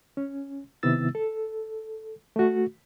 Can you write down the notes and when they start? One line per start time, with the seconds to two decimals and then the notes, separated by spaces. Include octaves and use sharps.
0.17 C#4
0.83 C3 D#3 B3 E4 E6 A6
1.15 A4
2.36 A3 F#4